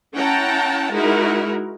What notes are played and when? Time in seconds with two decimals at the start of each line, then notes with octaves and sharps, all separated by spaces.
0.15 C#4 E4 F#5 G5 A5 A#5
0.93 G#3 D#4 E4 F#4 A#4